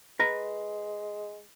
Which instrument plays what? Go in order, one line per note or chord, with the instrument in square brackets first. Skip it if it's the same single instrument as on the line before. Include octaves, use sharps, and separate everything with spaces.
[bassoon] G#3 [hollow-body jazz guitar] B4 A#5